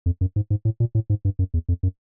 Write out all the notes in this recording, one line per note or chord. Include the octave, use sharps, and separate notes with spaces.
F2
F#2
G#2
G#2
A2
A#2
A2
G#2
G2
F#2
E2
F2
F#2